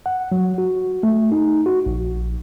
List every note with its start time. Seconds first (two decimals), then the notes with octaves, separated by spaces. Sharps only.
0.06 F#5
0.32 F#3
0.58 F#4
1.03 A3
1.32 D#4
1.66 F#4
1.86 A#1